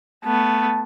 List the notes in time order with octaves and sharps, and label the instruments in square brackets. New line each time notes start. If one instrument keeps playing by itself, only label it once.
[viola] A3 B3 [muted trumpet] A5